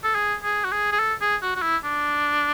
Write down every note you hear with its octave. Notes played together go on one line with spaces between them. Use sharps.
A4
G#4
G#4
F#4
G#4
G#4
A4
G#4
F#4
F#4
E4
D4